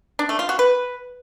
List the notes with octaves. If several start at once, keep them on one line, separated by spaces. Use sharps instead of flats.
D4
A3
F4
F#4
B4